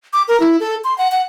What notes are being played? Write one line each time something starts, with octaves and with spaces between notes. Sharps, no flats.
D6
A#4
E4
A4
C6
F#5
F#5